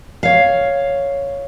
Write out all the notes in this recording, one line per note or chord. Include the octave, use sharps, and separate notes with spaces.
C#5 F5